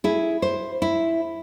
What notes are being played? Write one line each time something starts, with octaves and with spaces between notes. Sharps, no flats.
E4 G#4
C5
E4